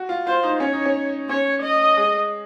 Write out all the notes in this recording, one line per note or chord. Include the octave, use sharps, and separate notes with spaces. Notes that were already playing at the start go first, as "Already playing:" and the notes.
Already playing: F#4
F4
F4 C5
D#4
C#4 C#5
D#4
C#4
C#4 C#5
D#5
G#3